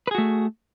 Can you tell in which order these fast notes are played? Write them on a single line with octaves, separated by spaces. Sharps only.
B4 G#4 F#4 A3